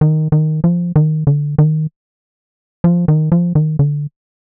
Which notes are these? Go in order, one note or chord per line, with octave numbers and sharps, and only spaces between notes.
D#3
D#3
F3
D#3
D3
D#3
F3
D#3
F3
D#3
D3